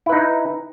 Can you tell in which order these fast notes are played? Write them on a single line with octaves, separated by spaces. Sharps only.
E4 B4 D#4